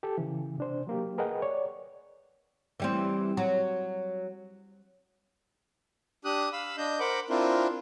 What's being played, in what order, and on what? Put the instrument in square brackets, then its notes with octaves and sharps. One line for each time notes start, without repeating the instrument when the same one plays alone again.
[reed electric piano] G4 A4
C#3 E3
C3 D4 C5
F#3 A#3 G4
G#4 A#4 B4 D#5 F#5 G5
C#5 D5
[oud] E3 G3 C4
F#3
[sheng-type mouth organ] D4 G4 D#6 F#6
F5 B5 E6
D4 D#5 G6
A#4 C5 F#5 B5 D6
C4 D4 E4 F4 A#4 C5